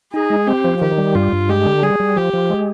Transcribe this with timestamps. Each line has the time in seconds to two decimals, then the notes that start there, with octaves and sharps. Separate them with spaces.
0.13 D#4 G#4
0.30 G#3
0.47 C4 G4
0.64 F3
0.81 D#3 G4
0.98 G3
1.15 G2 F4
1.33 G2
1.49 G#3 G4
1.66 D3
1.83 G3 G#4
2.00 G3
2.16 F3 G4
2.34 F3
2.50 G#3